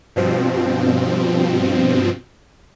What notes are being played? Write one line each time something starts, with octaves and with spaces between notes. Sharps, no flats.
G2 B2 F3 C4